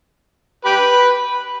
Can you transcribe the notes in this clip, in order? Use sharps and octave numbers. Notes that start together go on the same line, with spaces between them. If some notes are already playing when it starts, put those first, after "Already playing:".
G4 B4